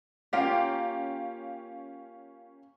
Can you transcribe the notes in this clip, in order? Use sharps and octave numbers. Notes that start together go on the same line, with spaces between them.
A#3 C#4 F4 G4 F5 G5